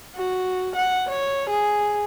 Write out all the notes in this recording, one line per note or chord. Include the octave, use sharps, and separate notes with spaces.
F#4
F#5
C#5
G#4